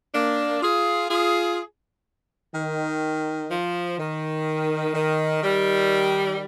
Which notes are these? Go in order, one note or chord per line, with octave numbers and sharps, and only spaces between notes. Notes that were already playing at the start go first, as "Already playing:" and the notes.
A#3 D4
F4 G#4
F4 G#4
D#3
F3
D#3
D#3
D#3 G3